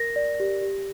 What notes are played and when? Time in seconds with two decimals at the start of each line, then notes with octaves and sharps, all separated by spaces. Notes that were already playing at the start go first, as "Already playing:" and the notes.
Already playing: A#4 A#6
0.16 D5
0.40 G4
0.63 G4